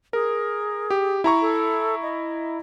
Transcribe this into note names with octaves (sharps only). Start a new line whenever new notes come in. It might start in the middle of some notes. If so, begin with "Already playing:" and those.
G#4 A#4
G4
E4 A#5 C#6
A4
D#5